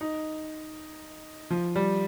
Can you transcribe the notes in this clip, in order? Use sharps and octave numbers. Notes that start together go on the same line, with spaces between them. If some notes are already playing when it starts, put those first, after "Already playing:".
D#4
F3
G3